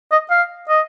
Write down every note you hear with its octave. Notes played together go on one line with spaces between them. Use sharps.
D#5
F5
D#5